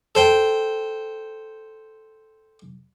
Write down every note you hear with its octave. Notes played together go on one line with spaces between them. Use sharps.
A4 C5 G5